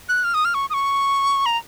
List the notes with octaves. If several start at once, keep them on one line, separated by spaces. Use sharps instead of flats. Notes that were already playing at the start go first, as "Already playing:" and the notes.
F#6
F6
D#6
F6
C#6
D#6
C#6
A#5